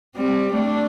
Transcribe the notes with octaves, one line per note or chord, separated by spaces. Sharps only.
G3 C4
A3 D4